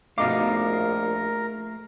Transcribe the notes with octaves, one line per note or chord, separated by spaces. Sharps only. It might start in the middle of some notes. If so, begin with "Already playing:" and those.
A#1 B2 A3 D#4 A#4 F5 D6